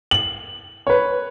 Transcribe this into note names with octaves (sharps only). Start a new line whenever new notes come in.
F#7
B4 C#5